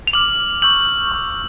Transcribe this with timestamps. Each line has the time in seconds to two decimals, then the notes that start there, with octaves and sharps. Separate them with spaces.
0.07 F7
0.13 D6 F6 F#7
0.62 C#6 E6 G6 F#7
1.12 C#6 F6